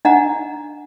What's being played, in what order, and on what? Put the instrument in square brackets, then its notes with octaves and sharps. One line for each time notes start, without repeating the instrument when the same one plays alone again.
[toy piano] D4 D#5 F#5 A#5